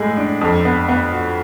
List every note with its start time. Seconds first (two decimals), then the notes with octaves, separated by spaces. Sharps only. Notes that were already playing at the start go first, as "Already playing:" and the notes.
Already playing: A2 G#3 G#4
0.17 D4
0.41 F2
0.65 B3
0.89 B3
1.12 F#4